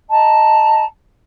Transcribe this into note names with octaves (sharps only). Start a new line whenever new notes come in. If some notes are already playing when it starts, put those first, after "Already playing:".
D#5 A5 A#5